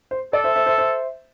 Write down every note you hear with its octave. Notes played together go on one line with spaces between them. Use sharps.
C5
A4 D5
C5 E5
C5 E5
C5 E5
C5 E5